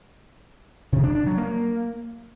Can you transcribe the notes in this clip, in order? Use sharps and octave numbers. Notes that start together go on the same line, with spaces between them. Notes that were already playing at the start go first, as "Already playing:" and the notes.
C3
D4
D4
F#3
A#3